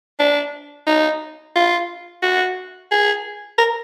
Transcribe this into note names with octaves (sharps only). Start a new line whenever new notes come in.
D4
D#4
F4
F#4
G#4
A#4